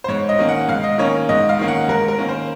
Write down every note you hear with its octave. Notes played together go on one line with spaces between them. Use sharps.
C5
G#2 C#5
D#5
D#3 A#3 C#4
F#5
G#2 F5
D#5
D#3 A#3 C#4 C#5
G#2 D#5
F5
D#3 A#3 C#4
F#5
G#2 A#4
A#4
D#3 A#3 C#4
C5